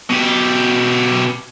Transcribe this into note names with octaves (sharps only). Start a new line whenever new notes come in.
B2 G4